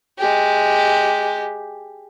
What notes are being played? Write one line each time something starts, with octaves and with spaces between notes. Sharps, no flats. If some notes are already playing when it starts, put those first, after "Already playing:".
G#3 G4